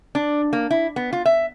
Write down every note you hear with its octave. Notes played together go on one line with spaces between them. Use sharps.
D4
A#3
E4
B3
F4
E5